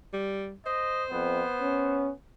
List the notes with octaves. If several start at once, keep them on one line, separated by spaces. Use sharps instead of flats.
G3
C5 D#5
F2 B3
C#4